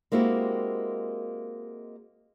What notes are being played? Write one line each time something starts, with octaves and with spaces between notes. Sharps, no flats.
G#3 A#3 C4 E4 F#4 G4